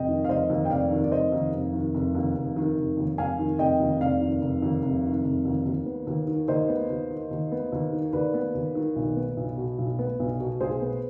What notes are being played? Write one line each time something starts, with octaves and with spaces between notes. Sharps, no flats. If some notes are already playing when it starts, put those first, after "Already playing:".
Already playing: F1 D#5 G5
D#3
F5
F1 C5 D#5
D#2
G5
F1 D5 F5
D#3
D5
F1 C5 D#5
D#2
F1
D#3
F1
D#2
F1
D#3
F1
D#2
F1 F5 G#5
D#3
F1 D#5 G5
D#2
F1 D5 F5
D#3
F1
D#2
F1
D#3
F1
D#2
D#2
B3
D#2
D#3
D#2 C5 D#5
B3
D#2
D#3
D#2
B3
D#2
D#3
D#2 B4 D5
B3
D#2
D#3
B1
B3
B1
B2
B1
B3
B1
B2
B1 G#4 C5
B3